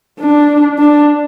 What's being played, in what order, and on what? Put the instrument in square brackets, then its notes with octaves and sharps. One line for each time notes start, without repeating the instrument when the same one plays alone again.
[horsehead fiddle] D4
D4